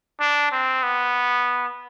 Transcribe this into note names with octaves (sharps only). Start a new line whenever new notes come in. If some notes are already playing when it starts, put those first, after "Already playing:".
D4
C4
B3